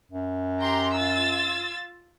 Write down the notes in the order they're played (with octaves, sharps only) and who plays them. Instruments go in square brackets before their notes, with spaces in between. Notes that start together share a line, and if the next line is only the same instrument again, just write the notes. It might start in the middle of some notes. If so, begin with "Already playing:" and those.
[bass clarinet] F#2
[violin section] G4 A#5 C6
F4 E6 A6